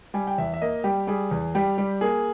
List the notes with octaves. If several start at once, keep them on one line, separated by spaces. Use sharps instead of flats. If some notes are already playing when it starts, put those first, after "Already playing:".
G3 G#5
G5
E2 E5
E5
A#3 D#5
G3 G4
G3 G#4
E2
G3 G4
G3
A#3 G#4